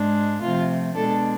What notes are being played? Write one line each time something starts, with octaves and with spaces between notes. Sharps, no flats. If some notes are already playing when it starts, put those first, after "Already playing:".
Already playing: G#2 G#3 D4
C3 F3 A3 F4
B2 G#3 D4 A4